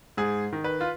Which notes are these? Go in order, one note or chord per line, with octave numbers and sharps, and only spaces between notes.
G#2 G#4
D#3
B4
F4